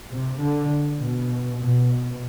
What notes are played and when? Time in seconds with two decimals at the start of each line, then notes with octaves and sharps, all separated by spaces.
0.12 C3
0.41 D3
1.01 B2
1.61 B2